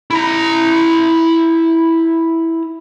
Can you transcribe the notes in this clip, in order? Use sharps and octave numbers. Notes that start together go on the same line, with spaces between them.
E4 A#5